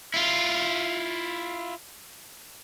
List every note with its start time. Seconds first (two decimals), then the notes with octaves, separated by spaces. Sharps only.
0.14 E4 F4